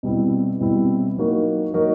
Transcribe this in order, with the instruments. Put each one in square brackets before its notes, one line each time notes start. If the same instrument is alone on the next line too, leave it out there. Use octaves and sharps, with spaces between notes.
[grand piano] B2 G3 C4 E4
B2 G3 C4 E4
F#3 A#3 D#4 F#4 A#4
F#3 A#3 D#4 F#4 A#4